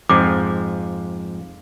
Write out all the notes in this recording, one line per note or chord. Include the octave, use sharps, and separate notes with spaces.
F2 G#2 F3 D6